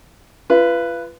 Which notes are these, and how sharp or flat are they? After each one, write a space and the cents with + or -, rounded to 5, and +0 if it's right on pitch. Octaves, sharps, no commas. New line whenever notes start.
F4 -35 B4 +0